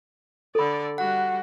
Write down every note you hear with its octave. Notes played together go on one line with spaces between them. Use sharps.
D3 A4 D5 B5
G3 F#4 F#5